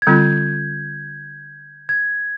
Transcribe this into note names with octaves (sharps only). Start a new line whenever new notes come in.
G#6
D3 G3 C4 F4 G6
G#6